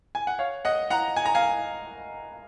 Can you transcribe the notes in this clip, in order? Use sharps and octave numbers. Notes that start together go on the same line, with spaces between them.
G#5
F#5
C#5 F5
D#5 F#5
F#5 A#5
G#5
A#5
F5 G#5